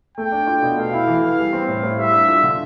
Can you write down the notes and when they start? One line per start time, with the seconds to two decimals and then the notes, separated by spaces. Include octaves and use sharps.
0.17 A3 G5
0.32 D4
0.47 F4
0.62 B2
0.77 A3 F5
0.93 E4
1.07 E3
1.22 E3
1.39 G3
1.53 C4
1.68 A2
1.83 A2
1.98 G3 E5
2.13 D4
2.28 F4
2.43 D3